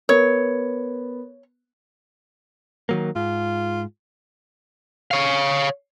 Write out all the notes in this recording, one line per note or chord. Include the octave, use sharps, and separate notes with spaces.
B3 A#4 C#5
D#3 F#3 A#3
G#2 F4
C#5 F5